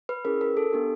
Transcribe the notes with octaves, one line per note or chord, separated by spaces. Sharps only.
B4
C#4 E4 G#4 A#4
A#4
A4
B3 D4 G4